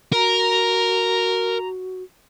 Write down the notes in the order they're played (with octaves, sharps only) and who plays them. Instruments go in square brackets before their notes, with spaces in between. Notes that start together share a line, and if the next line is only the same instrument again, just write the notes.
[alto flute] F#4 [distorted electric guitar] A#4 [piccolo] A#5